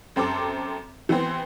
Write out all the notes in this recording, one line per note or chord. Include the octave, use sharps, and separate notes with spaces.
F#2 C4 A4 D6
E3 B3 C4